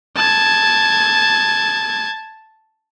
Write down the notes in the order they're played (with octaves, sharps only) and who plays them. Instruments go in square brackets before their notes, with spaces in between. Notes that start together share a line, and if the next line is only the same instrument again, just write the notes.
[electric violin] A5 G#6